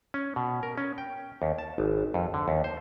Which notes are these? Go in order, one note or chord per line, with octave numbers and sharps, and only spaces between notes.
C#4
B2
A#4
C#4
G5
D#2
A5
G#1
F2
D3
D#2
C5